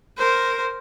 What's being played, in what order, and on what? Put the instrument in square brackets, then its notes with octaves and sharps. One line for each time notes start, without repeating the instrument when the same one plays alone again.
[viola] A#4 C5